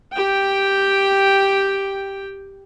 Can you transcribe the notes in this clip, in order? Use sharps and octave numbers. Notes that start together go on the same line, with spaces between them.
G4 G5